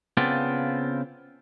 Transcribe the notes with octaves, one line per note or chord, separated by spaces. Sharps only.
C#3 B3 C4 F4 A4 D5